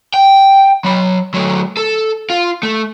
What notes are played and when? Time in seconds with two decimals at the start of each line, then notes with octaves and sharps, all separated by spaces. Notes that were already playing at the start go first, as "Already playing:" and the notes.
0.14 G5
0.84 F#3 B5
1.34 F#3 A3
1.77 A4
2.30 F4
2.63 A3